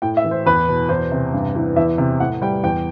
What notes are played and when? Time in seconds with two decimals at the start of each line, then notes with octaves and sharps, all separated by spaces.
0.02 A2 G5
0.17 E5
0.24 E3
0.31 C5
0.46 E2 B4
0.68 B2
0.89 E2 C5
1.11 C3
1.33 G2
1.55 E3
1.76 E2 E5
1.98 C3
2.20 A2 F#5
2.42 G3 G5
2.63 E2 G5